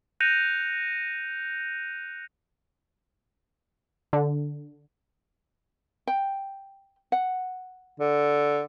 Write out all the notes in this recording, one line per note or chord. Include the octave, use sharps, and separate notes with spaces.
F#6 G6 A#6 C#7 D#7 F7
D3
G5
F#5
D3